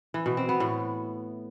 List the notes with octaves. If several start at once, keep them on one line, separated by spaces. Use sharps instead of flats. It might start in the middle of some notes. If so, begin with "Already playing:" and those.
E3
B2
C4
B3
A2